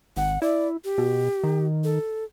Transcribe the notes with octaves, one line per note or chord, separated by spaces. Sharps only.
G#1 F#5
E4 D5
G4
B2
D#3
A4